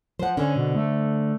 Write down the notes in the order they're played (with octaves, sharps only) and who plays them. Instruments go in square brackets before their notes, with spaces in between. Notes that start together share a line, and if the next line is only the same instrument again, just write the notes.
[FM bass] F3 [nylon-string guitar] C5 F#5
[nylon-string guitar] D3 C5 [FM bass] C#4
[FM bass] B2
A3